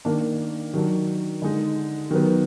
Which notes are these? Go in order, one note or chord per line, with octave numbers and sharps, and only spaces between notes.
D#3 A#3 D4
D#3 F#3 D4
D3 G#3 D#4
D#3 F#3 B3